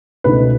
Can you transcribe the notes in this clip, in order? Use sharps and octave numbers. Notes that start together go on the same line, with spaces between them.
C#2 B2 A3 D#4 B4